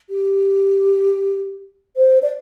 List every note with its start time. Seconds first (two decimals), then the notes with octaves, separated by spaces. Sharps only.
0.10 G4
1.97 C5
2.22 D5